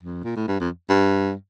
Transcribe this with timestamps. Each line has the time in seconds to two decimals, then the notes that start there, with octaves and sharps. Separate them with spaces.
0.03 F2
0.24 A#2
0.36 A2
0.48 G2
0.60 F2
0.89 G2